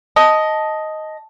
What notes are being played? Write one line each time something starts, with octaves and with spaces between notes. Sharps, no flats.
D#5 A5